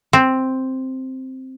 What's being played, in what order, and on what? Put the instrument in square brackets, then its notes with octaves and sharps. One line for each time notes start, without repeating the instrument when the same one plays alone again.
[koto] C4